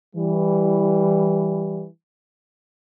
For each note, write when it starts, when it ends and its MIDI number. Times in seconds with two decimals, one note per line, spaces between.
0.15 1.86 52
0.15 1.86 55